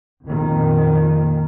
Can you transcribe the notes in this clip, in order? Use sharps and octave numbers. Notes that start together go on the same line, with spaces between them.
F2 A#2 D#3